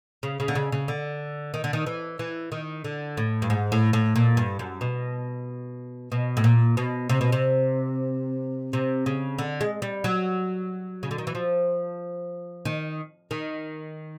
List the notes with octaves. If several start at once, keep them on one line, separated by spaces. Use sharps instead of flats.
C#3
C#3
D3
C#3
C#3
D3
D#3
D3
D#3
E3
E3
D#3
D3
A2
G2
G#2
A2
A2
A#2
G2
F#2
B2
B2
A2
A#2
B2
C3
B2
C3
C3
C#3
D3
G#3
G3
F#3
C#3
D3
D#3
E3
F3
D#3
D#3